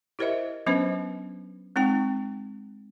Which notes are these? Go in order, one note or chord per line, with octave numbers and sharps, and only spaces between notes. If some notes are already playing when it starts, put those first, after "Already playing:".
E4 G4 A#4 C5 D#5 E5
F#3 B3 C#4 D4 B4 C5
G#3 C4 D#4 G5